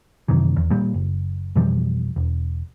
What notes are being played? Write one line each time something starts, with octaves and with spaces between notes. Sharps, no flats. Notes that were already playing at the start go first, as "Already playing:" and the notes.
F#2 C3 D#3 E3
E2
A#2 G3
F#1
F2 B2 E3 G3
E1